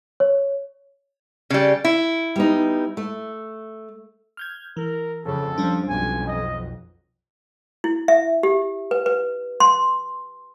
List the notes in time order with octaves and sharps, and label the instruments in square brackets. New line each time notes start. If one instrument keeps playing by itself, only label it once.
[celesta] C#5
[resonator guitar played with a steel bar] C#3 G3
E4
[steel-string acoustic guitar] G3 B3 D#4
A3
[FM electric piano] F6 G6 G#6
[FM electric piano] E3 [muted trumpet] A#4
[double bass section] F2 C#3 [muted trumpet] A4
[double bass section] F3 [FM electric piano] G3 C#4 D4
[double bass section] B1 F2 [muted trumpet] G#5
[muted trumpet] D#5
[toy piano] E4
E5
G4
B4
B4
C6